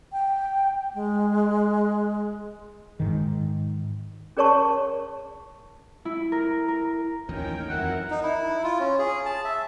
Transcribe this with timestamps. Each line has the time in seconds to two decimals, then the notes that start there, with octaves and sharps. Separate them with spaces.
0.12 G5
0.95 G#3
3.00 G#2 D#3
4.37 C#4 G#4 A#4 C#5 A5 C#6
6.05 E4
6.32 A#4
6.68 A#4
7.29 A1 D#2 D#3 F3 C#4 A#4 G5
7.70 F2 D#3 E3 F#3 E4 A#4 F#5
8.11 D#4
8.23 E4
8.64 F4
8.79 C#4
8.99 G#4
9.26 A5
9.44 E5